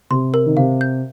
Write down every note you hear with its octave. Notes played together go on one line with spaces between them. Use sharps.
C3 C6
A#4
D#3
C3 F5
G6